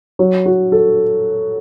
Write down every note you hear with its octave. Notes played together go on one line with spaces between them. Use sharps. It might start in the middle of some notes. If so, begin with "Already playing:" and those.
F#3
F#4
A4